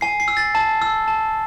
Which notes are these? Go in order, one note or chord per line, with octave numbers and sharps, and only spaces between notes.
G#5 C7
C7
E6
A6
A5 A6
E6
A5